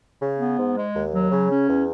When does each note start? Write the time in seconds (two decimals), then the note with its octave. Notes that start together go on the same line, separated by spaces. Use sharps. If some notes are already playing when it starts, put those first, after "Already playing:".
0.20 C#3
0.39 B3
0.57 G#2
0.77 G#3
0.95 D#2
1.13 F#3
1.32 C#3
1.50 C#4
1.68 E2